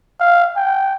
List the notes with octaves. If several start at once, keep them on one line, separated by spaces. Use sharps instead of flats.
F5
G5